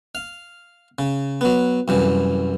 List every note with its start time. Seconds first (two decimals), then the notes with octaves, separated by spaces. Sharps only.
0.15 F5
0.99 C#3
1.41 F#3 B3
1.88 C2 F#2 E3